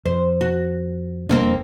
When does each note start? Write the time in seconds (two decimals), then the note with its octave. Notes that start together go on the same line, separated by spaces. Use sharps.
0.06 F2 C5
0.41 F#4
1.29 E1 F2 G3 A#3 C4 D4